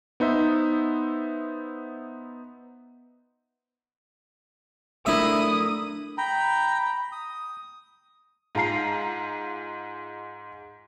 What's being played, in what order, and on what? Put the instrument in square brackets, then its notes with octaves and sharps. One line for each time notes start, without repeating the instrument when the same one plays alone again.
[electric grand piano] B3 D#4 C5 E5
[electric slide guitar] A3 D4 A#4 [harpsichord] E4 E5 [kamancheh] D#6
[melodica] G5 A#5 B5
D#6
[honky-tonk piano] G#2 F4 A#5 C7